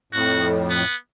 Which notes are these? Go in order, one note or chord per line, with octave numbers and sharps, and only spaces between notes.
F2 A2 F#4
B3